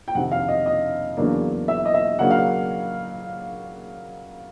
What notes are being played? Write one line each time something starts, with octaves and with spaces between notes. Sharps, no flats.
G5
F2 C3 D#3 F#5
F5
D#5
D#5
E2 C#3 F#3 A#3 D4
E5
D#5
E5
C#3 F#3 A#3 D4 F#5
F5